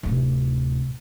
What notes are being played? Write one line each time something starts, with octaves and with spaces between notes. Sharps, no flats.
D1 C3